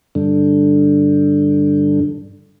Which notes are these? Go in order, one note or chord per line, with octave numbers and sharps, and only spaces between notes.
G2 D3